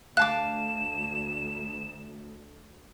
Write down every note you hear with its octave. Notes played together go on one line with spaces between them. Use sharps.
D2 F5 A5 D6 F#6 E7